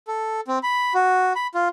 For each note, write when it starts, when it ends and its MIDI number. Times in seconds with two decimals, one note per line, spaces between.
0.08 0.41 69
0.48 0.59 60
0.63 0.93 83
0.94 1.33 66
1.36 1.47 83
1.54 1.68 65